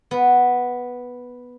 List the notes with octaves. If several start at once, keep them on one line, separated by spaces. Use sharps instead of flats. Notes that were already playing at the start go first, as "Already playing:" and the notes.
B3